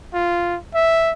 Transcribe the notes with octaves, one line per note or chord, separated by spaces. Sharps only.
F4
E5